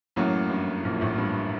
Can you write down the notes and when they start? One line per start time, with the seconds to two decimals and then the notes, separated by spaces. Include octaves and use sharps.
0.16 A1 F#2 A2 F#3 A#3
0.50 G2
0.84 A#1 A#2
1.01 A1 A2
1.18 G2